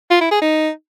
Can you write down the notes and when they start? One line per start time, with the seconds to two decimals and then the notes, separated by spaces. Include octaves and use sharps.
0.11 F4
0.21 E4
0.31 G#4
0.42 D#4